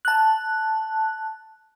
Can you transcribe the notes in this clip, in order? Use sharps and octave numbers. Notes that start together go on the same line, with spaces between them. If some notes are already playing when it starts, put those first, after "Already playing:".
A5 F#6